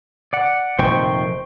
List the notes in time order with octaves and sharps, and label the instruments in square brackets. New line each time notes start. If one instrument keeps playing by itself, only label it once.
[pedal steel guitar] D5 F#5
[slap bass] F1 A#2 D#3 [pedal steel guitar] C5 G5 C#6